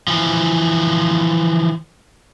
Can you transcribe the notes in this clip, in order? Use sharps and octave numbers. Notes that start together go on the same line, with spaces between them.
E3 F3